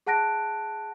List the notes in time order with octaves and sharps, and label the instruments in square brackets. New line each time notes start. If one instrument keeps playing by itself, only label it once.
[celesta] G#4 F#5 A5 F#6 A#6 D7